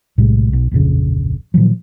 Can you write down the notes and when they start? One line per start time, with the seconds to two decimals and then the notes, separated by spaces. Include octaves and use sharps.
0.18 B1 A2 C3 G#3
0.53 B1
0.71 D1 A#1 F2 C#3
1.54 A#2 D#3 F3 F#3